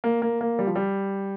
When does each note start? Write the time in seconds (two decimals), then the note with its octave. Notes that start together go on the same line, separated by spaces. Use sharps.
0.04 A#3
0.22 A#3
0.41 A#3
0.59 G3
0.67 F3
0.75 G3